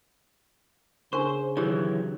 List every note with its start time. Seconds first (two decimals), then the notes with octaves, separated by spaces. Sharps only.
1.13 C#3 D4 A#4 C5 C#6
1.57 D#3 E3 F#3 G4 C#5